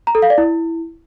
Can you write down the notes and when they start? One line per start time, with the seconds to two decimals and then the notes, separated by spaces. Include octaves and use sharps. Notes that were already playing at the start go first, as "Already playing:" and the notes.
0.07 A#5
0.15 A4
0.22 F5
0.30 D5
0.38 E4